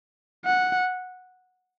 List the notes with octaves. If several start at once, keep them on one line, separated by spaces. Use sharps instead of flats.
F#5